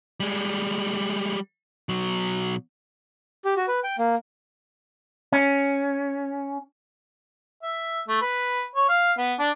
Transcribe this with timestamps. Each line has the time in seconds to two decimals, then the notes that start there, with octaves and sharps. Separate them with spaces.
0.20 G3 G#3
1.89 B2 F#3
3.45 G4
3.56 F#4
3.68 B4
3.84 G5
3.98 A#3
5.32 C#4
7.63 E5
8.08 A3
8.22 B4
8.76 C#5
8.89 F5
9.18 B3
9.39 D4